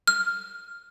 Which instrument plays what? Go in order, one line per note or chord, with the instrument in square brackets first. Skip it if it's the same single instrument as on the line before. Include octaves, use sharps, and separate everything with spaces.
[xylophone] F6